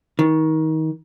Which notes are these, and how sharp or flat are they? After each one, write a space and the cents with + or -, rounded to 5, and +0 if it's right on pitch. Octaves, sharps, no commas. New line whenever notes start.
D#3 +25